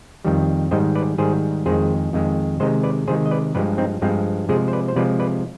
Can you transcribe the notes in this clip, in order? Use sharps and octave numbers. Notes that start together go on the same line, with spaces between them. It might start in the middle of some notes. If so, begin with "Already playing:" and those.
F2 D#3 G3
G#2 D#3 G3 C5 D#5
B4 D5
G#2 D#3 G3 G#4 C5
F2 D#3 G#3 G#4 C5
F2 D#3 G#3
C3 D#3 G#3 C5 D#5
B4 D5
C3 D#3 G#3 G#4 C5
D#5
B4 D5
G2 F3 G#3 B4 D5
C4 D#4
G2 F3 G#3 C4
C3 F3 G#3 G#4 C5
C5
B4 D5
C5
C3 F3 G#3 B4 D5
B4 D5